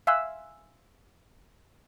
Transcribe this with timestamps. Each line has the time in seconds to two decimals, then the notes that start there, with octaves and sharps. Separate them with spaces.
0.07 E5 F5 G#5 C6 E6 F#6